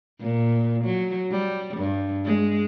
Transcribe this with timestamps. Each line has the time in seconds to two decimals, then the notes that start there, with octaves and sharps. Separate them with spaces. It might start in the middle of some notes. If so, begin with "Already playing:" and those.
0.21 A#2
0.85 F#3
1.31 G3
1.77 G2
2.25 G#3